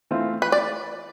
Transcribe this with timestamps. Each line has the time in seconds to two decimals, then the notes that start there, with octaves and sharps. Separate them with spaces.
0.11 E3 A3 C4 F4
0.42 B4
0.52 D5